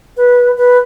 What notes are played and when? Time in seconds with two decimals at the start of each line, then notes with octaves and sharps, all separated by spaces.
0.17 B4
0.58 B4